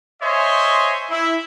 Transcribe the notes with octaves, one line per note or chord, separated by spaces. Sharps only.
C5 C#5 D#5 E5 G#5 C6
E4